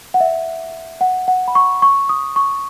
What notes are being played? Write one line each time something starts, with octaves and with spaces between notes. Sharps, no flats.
F#5
E5
F#5
F#5
B5
C#6
C#6
D#6
C#6